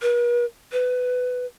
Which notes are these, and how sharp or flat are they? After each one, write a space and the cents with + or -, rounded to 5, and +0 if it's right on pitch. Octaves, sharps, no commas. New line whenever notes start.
B4 -45
B4 +15